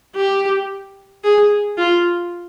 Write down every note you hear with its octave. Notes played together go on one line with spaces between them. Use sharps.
G4
G#4
F4